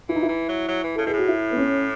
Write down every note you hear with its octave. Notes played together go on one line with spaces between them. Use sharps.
E3 E4
D#4
E4
E3
F#3
F#3
E3
C#3 A4
B2 G#4
A2 F#4
E4
B3
C#4